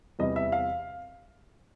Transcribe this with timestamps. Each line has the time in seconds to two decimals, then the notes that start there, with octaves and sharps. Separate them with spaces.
0.19 E2 C3 E3 G3 D#5
0.36 E5
0.52 F5